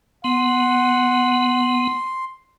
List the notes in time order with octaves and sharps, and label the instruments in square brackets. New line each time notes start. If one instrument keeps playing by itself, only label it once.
[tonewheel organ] B3 [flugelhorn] F#5 [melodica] C6